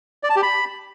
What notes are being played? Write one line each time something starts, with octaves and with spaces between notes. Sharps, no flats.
D5
A5
G4
B5